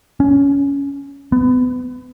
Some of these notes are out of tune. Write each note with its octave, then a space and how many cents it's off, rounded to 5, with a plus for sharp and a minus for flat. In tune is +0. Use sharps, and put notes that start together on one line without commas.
C#4 +15
B3 +30